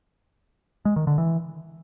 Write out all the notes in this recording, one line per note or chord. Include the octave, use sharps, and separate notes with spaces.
G#3
D#3
D3
E3